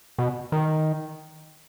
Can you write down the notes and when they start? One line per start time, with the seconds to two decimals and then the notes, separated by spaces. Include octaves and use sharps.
0.18 B2
0.52 D#3